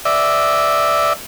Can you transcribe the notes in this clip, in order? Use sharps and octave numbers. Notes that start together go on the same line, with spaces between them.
D5 E5